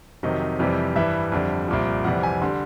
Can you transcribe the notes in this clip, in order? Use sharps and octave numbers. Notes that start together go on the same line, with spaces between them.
F2 C3 D#3 F#3 D#5
F2 C3 E3 G3
G2 E3 G3 E5
F2 D3 G3
C2 A#2 F3
F2 C3 E3 G3 F#5
G#5
D3 G3 C6